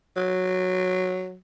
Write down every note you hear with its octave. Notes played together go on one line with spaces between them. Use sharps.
F#3